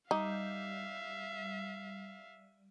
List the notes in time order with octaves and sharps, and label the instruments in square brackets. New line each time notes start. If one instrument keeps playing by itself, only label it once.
[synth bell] G3 [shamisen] D#4 [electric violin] E5 F5